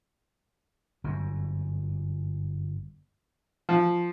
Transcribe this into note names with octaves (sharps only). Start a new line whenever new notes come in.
G1 F#2
F3